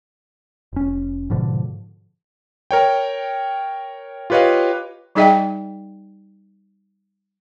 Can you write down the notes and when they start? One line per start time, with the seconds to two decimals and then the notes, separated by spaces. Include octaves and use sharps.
0.73 F1 C#4
1.30 G#2 B2 D3 F3
2.71 A#4 C#5 G5
4.30 F4 G4 B4 C#5 D#5 F5
5.15 G3 D#4 G#4 D#5 E5 G5